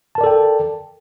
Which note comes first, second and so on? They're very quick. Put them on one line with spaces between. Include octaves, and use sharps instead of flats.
A5 A#4 D5 A4 G5